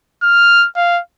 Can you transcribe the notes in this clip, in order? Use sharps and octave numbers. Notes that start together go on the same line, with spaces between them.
F6
F5